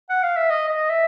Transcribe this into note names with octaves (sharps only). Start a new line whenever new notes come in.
F#5
F5
E5
D#5
D#5
E5